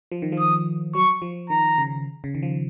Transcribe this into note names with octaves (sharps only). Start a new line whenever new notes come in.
F3
D#3
F3
D#6
F#3 C#6
F3
D#3 A#5
C#3
C#3
D#3
F3